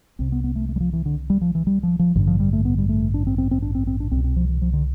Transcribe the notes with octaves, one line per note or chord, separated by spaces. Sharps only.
C2 C3 C4
B3
B3
A3
A3
G3
F3
E3
D3
G3
F3
E3
G3
F3
F3
A1 G2 D3 E3
F3
G3
A3
B3
G3
A3
D4
C4
C4
C4
D4
C4
C4
D4
C2 C4
B2
C4
F3
E3
F3
D3